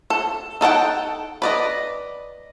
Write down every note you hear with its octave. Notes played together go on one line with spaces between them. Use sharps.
A4
D#4 A4 F#5 G5
B4 D5 D#5